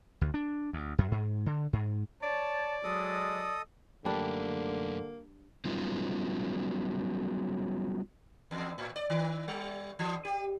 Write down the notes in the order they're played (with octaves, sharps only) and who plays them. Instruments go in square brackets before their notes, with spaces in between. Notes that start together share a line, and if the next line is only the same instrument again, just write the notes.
[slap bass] D2
D4
D2
F#2
G#2
D3
G#2
[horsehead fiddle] C#5 [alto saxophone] D5 [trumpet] A5
[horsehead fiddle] F#3 [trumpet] G#3 [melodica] A4 D#5 D#6
[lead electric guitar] F#2 A3 [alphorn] D3 [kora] G3 D4 [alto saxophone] A#3
[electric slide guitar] F#3 G3 B3 C#4 D#4 F4
[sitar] E2
A2
D5
D#3
G3
E3
G4